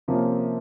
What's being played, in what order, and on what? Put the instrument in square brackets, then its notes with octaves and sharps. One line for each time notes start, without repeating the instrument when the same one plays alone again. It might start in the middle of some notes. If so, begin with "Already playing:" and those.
[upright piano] C3 F3 A#3 C#4